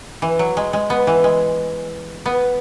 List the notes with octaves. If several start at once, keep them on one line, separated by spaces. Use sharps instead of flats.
E3
F#3
G#3
G#3
B3
E3
G#3
B3